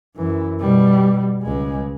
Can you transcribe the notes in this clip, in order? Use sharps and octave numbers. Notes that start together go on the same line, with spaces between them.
F#2 E3
B2 G3
C#2 G#3